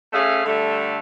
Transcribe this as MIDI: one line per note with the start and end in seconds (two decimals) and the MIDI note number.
0.13 0.42 57
0.13 0.42 61
0.13 0.42 68
0.13 0.42 76
0.13 0.42 77
0.45 0.99 50
0.45 0.99 55
0.45 0.99 57